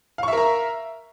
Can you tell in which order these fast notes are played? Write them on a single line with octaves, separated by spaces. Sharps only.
F5 C#6 E5 A#4 A#5